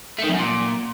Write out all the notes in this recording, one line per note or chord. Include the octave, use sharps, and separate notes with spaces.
A3
D#3
F2
F#2
A#2